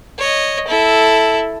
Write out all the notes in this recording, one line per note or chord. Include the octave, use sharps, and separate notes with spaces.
C#5 D#5
E4 A4